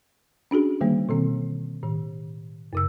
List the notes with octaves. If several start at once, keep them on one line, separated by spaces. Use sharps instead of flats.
C#4 D4 F#4 G#4
D3 D#3 G3 A#3
B2 D#3 C4
A2 D#3
F#2 C#3 E6